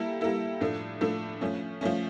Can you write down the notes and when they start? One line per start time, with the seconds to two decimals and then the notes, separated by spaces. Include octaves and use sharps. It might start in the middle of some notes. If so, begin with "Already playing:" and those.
Already playing: G3 A#3 E4 A4
0.21 G3 A#3 E4 A4
0.60 A2 F3 A3 D4 A4
1.01 A2 F3 A3 D4 A4
1.41 F3 A3 C#4
1.81 F3 A3 C#4